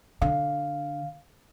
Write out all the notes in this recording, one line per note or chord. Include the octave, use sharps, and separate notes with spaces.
D3 F5